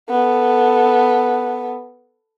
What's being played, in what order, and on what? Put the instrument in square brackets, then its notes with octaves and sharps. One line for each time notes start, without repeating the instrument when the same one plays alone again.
[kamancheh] B3 A4